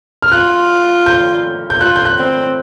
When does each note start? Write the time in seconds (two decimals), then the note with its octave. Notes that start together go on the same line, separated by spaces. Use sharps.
0.22 F6
0.32 F4 F#6
1.06 G6
1.70 G6
1.80 F4 F#6
1.96 G6
2.05 F#6
2.18 C4